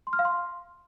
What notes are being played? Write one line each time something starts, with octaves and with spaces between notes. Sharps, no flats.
C6
F6
F5
C6